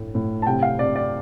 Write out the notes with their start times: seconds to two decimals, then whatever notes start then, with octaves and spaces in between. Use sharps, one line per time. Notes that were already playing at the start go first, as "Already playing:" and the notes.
Already playing: A2 A3
0.15 A2
0.42 A5
0.47 C3 G5
0.62 F5
0.79 C3 D5
0.96 D5